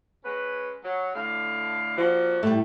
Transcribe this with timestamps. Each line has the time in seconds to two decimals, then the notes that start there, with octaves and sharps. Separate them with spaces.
0.24 G#3 C#4 B4
0.84 F#3
1.15 A2 D3 F5
1.98 F3 A#3 D4 F#4
2.43 A2 G3 A3